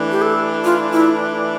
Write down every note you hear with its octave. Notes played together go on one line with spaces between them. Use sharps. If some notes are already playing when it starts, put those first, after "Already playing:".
Already playing: E3 A3 D4
G4
A4
F4
E4